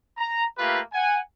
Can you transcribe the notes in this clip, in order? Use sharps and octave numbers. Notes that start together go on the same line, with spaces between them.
A#5
A3 A#3 F4 G4 B4
F#5 G#5